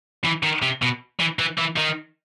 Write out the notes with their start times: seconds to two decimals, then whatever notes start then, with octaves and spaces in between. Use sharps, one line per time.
0.25 E3
0.43 D#3
0.62 C3
0.82 B2
1.20 E3
1.39 E3
1.58 E3
1.77 D#3